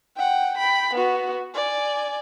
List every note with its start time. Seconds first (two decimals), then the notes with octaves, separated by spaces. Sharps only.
0.17 F#5 G5
0.57 G5 B5
0.94 B3 F#4
1.54 D5 G#5